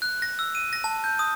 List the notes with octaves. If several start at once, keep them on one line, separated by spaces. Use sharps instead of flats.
F#6
A#6
E6
D#7
A#6
A5
G6
D#6